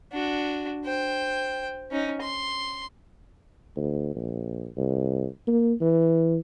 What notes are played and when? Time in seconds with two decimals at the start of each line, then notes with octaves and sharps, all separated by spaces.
0.12 D4 F#4
0.85 C5 G5
1.91 C#4 D#4
2.21 C6
3.77 D2
4.15 A#1
4.77 C2
5.47 A#3
5.81 E3